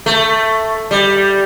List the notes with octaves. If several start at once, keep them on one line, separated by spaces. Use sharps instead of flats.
A3
G3